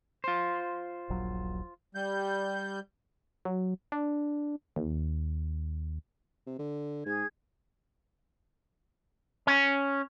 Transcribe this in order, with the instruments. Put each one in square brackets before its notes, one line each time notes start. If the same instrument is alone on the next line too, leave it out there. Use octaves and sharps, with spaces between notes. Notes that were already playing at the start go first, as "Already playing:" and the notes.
[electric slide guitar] F4 C5
[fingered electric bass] D#1 A#1 F#3
[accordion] G3 G6
[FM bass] F#3
D4
D#2
[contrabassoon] C3
D3
[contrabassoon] G#2 [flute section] G#4 G#6
[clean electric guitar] C#4